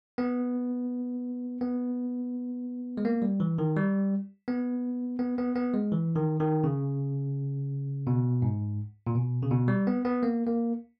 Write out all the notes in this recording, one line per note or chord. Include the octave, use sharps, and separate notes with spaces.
B3
B3
G#3
A#3
G3
E3
D#3
G3
B3
B3
B3
B3
G#3
E3
D#3
D#3
C#3
B2
G#2
A#2
B2
C#3
B2
G3
B3
B3
A#3
A#3